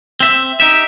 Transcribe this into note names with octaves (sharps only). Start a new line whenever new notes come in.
C4 E5
D#4 G4 E5